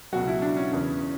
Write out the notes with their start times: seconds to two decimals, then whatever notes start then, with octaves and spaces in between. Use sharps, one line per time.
0.13 C#2 B2 F#3 F#4
0.27 E4
0.42 D4
0.57 C#4
0.71 E2 C#3 E3